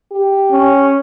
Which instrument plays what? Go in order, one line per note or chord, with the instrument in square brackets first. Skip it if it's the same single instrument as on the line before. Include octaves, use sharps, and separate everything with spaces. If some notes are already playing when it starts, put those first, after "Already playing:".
[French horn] G4
[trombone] C#4